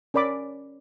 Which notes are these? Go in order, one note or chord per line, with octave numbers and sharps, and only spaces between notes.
C#4 A#4 D5 B5 D6